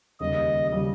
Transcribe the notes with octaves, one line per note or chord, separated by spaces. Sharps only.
D#2 C#3 G3 D#5
C#3 G3